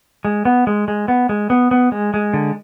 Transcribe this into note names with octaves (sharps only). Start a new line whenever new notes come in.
G#3
B3
G#3
G#3
B3
G#3
B3
B3
G#3
G#3
D3